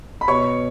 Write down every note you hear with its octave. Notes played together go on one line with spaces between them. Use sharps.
B5
B2 C#5 C#6